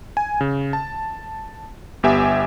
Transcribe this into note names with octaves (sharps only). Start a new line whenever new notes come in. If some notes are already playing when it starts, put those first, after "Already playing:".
G#5
C#3
A5
G1 B3 G4 E5 G#5